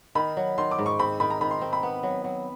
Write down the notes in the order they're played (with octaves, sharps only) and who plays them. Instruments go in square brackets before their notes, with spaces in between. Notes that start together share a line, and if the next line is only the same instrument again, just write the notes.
[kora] D#3 [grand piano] B5
[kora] F#3
[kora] D#3 [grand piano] C6
[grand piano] D6
[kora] G#2
[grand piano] C#6
[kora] C4 [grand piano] B5
[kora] D#3 [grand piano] B5
[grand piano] A#5
[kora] D#3 [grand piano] B5
[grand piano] C6
[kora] C4
[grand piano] B5
[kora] B3
F#3
F#3